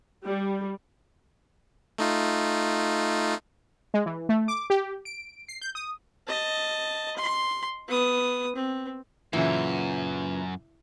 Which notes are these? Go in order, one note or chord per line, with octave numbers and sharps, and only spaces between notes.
G3
A3 D#4 F4
G#3
E3
A3
D6
G4
D7
C7
G6
D#6
D#5 A5
C6
B3 D#6
C4
F#2 A#2 C#3 E3